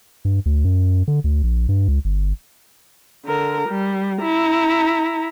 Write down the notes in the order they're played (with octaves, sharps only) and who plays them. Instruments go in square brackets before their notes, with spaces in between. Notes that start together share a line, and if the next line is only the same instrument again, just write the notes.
[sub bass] G2
D2
F#2
D3
D2
A#1
G2
C#2
G1
[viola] D3 A#4
G3
E4 A#5